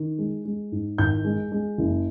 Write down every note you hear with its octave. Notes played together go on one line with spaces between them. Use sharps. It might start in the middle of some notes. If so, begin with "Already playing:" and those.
Already playing: D#3
G#3
G#3
G#2
G#1 G6
G#3
G#3
F#1